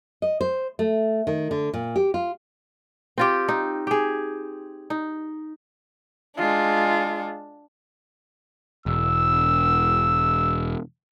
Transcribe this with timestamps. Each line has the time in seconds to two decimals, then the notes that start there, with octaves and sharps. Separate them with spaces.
0.22 D#5
0.41 C5
0.79 A3
1.27 D#3
1.51 D3
1.73 A#2
1.96 G4
2.14 F4
3.18 C4 F4 G4
3.48 D#4
3.87 G4 G#4
4.90 D#4
6.37 G#3 D4 F4
8.86 E1 E6